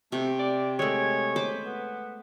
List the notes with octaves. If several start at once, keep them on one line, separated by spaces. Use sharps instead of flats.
C3 A3
D5
G#3 A3 C#5
B4 C5 D6
B3